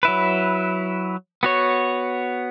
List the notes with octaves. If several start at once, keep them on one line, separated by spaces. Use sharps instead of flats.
F#3 E4 B4
B3 F#4 C#5